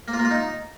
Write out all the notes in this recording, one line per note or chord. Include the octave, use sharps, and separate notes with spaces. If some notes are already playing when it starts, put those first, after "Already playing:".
A#3
F4
A#3
F4
D#4